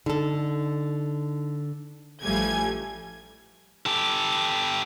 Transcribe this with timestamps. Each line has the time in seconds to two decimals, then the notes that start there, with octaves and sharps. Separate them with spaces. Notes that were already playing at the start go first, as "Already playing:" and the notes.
0.06 D3 D#4 A4
2.23 A1 F3 G3 A3 G#5 G#6
3.86 G4 A4